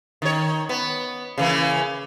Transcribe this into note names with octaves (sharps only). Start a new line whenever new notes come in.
D#3 C#5
B3
C#3 E3 A#3